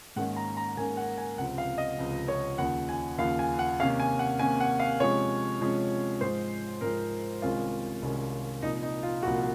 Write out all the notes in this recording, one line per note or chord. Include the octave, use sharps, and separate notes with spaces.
G#2 D#3 A#3 C#4 F#5
A#5
A#5
G#2 D#3 A#3 C#4 G#5
F#5
G#5
C#2 C3 F3 C4 F#5
F5
D#5
C#2 C3 F3 C4
C#5
D#2 C#3 F3 F#5
G#5
D#2 C#3 F3 F5
G#5
F#5
C3 D#3 A#3 C#4 F5
G#5
F#5
C3 D#3 A#3 C#4 G#5
F#5
F5
C3 F3 G#3 C#4 C#5
C3 F3 G#3 C#4
G#2 F3 G#3 C5
G#2 F3 G#3 A#4
C2 C3 D#3 G#3 C#4 F4
C2 C3 D#3 G#3 C#4
C2 A#2 F3 D#4
D#4
F4
C2 A#2 F3 F#4